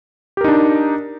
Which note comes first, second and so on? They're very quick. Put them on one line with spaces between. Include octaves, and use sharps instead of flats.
G4 A#4 D#4 D4